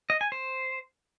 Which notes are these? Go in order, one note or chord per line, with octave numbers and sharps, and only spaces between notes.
D#5
G#5
C5